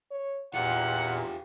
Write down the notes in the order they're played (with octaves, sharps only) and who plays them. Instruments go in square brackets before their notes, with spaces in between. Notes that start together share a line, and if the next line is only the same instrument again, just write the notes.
[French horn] C#5
[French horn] E2 [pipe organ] A#2 [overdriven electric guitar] F4 G4 [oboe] F#5